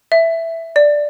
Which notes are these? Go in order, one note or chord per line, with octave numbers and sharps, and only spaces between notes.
E5
D5